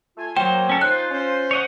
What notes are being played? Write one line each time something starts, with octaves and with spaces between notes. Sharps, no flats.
A3 F4 G#5
F#3 A#3 C5 G5
C#4 A4
D#4 F4 C5 F#6
C#4 C5
C#5 D#5 F#5